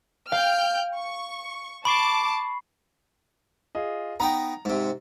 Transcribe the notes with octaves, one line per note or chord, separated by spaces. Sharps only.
F5 G5 F6 G6
C#6
A5 B5 C#6 D6 C7
F4 G#4 D#5
B3 D#4 G5 A#5
G#2 C3